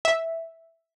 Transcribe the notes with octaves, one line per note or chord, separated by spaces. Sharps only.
E5